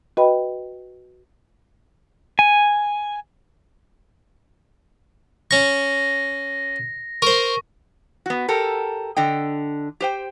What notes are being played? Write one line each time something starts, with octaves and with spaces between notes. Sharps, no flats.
F#4 B4 D#5 G5 B5
G#5
C#4 C#6 A#6
A#4 C5 C#6
B3 F#4
G4 A4 A#4
D3 D#5 G5
G4 C5 G5